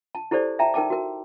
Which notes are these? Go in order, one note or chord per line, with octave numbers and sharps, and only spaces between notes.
A5
E4 G4 A4 C5 D5
E5 G5 A5 A#5
D#4 A#4 G5 A5 D6
F#4 A#4